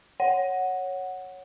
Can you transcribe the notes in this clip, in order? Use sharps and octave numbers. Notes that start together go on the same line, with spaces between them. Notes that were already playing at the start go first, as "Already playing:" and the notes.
C#5 F#5